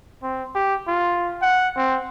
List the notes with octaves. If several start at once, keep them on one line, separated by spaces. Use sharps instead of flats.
C4
G4
F4
F#5
C4